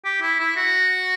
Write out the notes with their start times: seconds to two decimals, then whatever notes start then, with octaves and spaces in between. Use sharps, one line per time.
0.05 G4
0.21 E4
0.40 E4
0.56 F#4